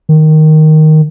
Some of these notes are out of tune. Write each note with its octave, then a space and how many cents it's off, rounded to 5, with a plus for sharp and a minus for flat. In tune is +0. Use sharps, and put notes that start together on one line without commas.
D#3 +0